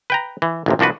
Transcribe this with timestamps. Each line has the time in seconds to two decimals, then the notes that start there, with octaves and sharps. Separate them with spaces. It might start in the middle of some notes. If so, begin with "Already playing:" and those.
0.10 B4 G5 A#5
0.42 E3
0.66 A1 D#2 C3
0.79 C2 F3 D4 F#4 B4